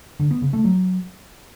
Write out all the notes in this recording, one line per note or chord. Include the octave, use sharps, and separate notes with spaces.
D3
B3
C#3
A3
F#3